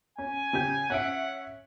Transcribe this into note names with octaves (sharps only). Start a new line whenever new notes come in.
C#4 G#5
C#3 G4 G6
C#4 E5 F#5 D7